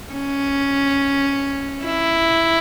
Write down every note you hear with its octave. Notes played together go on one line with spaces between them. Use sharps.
C#4
E4